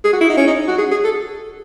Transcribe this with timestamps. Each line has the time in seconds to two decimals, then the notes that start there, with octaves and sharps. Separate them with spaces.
0.05 G#4
0.13 F#4
0.21 E4
0.29 D#4
0.37 C#4
0.48 D#4
0.68 F#4
0.78 G#4
0.91 G#4
1.04 A4